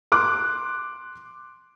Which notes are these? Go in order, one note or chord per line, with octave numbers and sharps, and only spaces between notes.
C6 D6 F#6